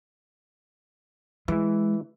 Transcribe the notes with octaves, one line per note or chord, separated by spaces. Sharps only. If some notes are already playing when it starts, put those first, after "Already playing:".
E3 G#3 E4